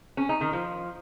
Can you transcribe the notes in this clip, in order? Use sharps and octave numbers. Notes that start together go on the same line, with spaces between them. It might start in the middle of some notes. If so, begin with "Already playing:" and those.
C#4
D#4
D#3
F3